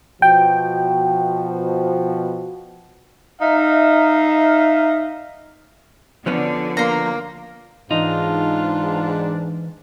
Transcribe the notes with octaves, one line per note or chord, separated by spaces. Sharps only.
B2 F3 F#4 G5
D#4 E5 F5
D3 F3 B3 C#4
A#3 A#5 C6
G#2 E3 D4 D#4 F4